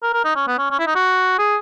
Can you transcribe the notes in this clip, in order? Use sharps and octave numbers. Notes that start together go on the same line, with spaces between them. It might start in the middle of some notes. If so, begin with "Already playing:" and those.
A#4
A#4
D#4
C#4
B3
C#4
C#4
E4
D#4
F#4
G#4